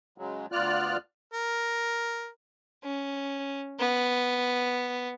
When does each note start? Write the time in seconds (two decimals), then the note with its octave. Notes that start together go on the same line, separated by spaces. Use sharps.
0.18 C#3 F#3 G#3
0.52 D2 B3 F4 D5 F6 F#6
1.34 A#4
2.84 C#4
3.79 B3